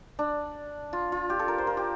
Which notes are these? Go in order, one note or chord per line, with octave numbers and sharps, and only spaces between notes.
D4
F4
F4
G4
A4
A#4
C5
A#4
G4